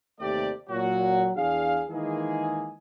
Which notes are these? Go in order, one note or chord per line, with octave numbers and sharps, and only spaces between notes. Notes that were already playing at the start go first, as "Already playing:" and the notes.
D#2 C3 A3 G4 D5
A#2 F#3 F#4
E2 D4 G#4 F5
D#3 E3 G#3 A#3 G#4